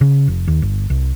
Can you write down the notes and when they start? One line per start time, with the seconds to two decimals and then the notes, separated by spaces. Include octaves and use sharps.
0.01 C#3
0.27 F1
0.48 D#2
0.62 G1
0.90 C2